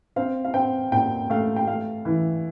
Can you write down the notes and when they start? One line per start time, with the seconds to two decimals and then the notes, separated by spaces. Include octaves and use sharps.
0.16 C4 F5
0.45 F5
0.54 C4 G5
0.92 A#2 G5
1.30 A3 F5
1.56 G5
1.67 A3 F5
2.05 E3